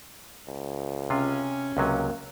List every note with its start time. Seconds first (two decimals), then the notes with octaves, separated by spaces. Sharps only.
0.48 C#2
1.10 C3 C#4 F4
1.77 C#2 C3 F#3 A#3